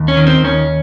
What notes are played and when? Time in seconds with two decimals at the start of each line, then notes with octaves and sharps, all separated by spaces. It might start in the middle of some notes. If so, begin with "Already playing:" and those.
Already playing: D#2
0.08 C#4
0.17 D#3
0.27 C4
0.44 D#2 C#4